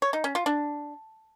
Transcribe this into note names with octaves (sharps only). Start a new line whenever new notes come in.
C#5
D#4
C#4
F4
D4